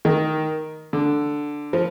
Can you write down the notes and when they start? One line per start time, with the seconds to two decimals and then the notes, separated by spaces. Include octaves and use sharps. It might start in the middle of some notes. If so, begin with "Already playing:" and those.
0.05 D#3
0.93 D3
1.73 F3